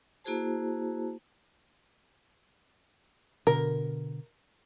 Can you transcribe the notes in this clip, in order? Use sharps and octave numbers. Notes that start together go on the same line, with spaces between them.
A#3 E4 F#4 G#4 C5 A5
B2 D3 A#4